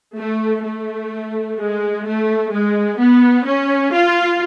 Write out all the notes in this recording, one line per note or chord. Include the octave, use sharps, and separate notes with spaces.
A3
A3
G#3
A3
G#3
B3
C#4
F4